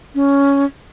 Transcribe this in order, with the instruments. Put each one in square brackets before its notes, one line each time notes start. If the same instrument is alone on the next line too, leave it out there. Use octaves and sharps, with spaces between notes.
[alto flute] C#4